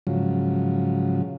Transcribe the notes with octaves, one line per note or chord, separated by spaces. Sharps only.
G#2 C#3 F3 F#3